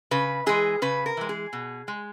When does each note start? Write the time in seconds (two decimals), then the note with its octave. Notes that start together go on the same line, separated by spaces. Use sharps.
0.11 C#3 B4
0.46 E3 G#3 G#4
0.82 C#3 B4
1.06 A#4
1.17 E3 G#3
1.29 G#4
1.53 B2
1.88 G#3